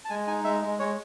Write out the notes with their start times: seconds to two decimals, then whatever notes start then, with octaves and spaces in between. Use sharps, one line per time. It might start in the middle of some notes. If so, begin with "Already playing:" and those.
0.05 A5
0.10 G#3 G#5
0.27 D#4 G#5
0.44 G#3 E5
0.61 G#3
0.79 G#3 C#5